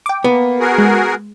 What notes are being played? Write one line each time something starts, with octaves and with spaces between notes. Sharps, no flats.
G5 D6
A#3 B3
F#4 G#4 A#4
G#3